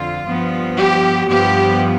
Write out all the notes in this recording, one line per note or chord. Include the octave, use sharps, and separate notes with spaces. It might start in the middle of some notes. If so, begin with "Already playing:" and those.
Already playing: F2 D3 F4
G2 F3 B3
G4
G2 F3 B3 G4